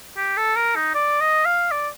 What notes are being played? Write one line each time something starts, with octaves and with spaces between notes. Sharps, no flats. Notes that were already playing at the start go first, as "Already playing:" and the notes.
G4
A4
A#4
D#4
D5
D#5
F5
D5